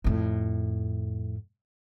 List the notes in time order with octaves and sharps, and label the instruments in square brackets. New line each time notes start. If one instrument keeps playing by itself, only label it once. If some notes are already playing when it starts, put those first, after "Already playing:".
[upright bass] F2 A2